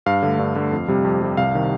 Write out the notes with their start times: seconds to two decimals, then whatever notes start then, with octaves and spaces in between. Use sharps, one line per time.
0.06 G2 F5
0.22 D3 A3
0.39 G2
0.56 D3 A3
0.72 F2
0.88 C3 G3
1.05 F2
1.22 C3 G3
1.37 C2 F5
1.55 C3 D#3